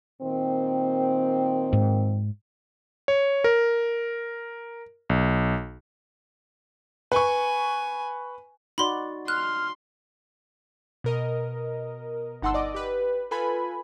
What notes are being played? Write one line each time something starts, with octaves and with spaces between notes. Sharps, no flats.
A#2 D#3 C4
G#2
C#5
A#4
B1
B4 G#5 C#6
D#4 F#4 D5 B5 C6
C6 F6 F#6
B2 A#4 D#5
G1 D#4 F#5 A5 C6 E6
D5 D#5 D6
G4 B4
F4 A4 B4 G#5 B5